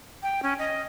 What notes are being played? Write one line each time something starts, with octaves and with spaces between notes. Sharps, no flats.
G5
C#4
D#5